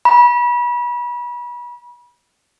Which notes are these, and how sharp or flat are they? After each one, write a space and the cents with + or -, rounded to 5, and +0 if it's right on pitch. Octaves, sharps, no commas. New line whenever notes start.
B5 -30